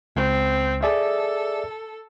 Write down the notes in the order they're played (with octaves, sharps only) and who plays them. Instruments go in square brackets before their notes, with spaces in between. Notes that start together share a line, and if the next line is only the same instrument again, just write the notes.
[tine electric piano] C#2 [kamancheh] C4
[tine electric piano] G#4 D5 E5 [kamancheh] A4